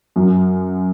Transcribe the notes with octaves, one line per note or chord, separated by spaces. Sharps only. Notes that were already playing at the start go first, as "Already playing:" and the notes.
F#2